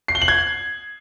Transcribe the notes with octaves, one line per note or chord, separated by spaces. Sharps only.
C7
G7
F#7
G#6